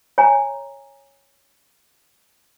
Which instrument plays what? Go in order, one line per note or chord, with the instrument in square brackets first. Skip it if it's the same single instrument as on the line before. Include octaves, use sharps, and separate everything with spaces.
[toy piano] C#5 G#5 A#5